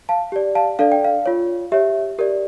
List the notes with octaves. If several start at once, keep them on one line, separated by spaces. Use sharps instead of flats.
F5 A5
G4 D5
F5 A5
D4 A4 D5 F5
G5
F5
F4 C#5
G4 C#5 E5
G4 A#4 D5